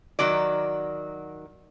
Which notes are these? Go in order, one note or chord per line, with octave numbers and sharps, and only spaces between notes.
D#3 F#3 F#4 D5